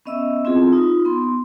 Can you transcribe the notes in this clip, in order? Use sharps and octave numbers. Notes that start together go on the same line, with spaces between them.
B3 C#4 D#5 E5 E6
C4 E4 F4 G#4
D#4 F4
B3 C6